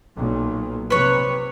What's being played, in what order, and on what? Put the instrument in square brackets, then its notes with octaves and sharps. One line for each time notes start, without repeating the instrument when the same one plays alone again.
[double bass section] B1 A#2
[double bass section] C3 [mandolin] B4 C#5